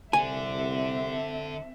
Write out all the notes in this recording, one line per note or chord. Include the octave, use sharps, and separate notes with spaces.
C2 D3 C4 E5 G#5